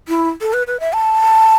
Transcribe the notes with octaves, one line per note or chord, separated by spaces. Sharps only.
E4
A4
B4
B4
E5
A5